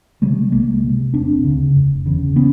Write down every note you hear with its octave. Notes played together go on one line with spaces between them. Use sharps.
C3 G3 A3
C2 G#3 A#3
C3
E1 C4 D4
D2 C#3
F1
E2 C#3
B3 C#4